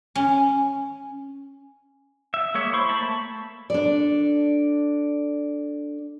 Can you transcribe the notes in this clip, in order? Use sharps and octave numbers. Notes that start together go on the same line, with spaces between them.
C#4
E5
G#3 A#3 C#5 E5
E4 C5 C#6
A3 A#3 A5 B5
D4 A4 D5